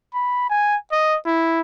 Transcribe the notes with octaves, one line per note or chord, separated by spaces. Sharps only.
B5
G#5
D#5
E4